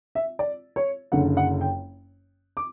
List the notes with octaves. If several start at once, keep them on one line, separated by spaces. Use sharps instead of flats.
E5
D5
C#5
F#1 F#2 D3 F#5
F#5
G5
D6